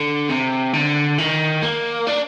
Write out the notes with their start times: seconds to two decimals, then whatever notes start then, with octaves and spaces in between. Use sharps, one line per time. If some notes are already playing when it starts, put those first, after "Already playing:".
Already playing: D3
0.30 C3
0.73 D3
1.18 D#3
1.63 A#3
2.07 D4